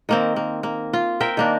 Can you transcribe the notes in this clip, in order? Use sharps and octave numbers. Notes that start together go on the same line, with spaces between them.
D#3 A#3 C4
A#3
A#3
F4
A#4 C5 E5 G5
D#3 A#3 D4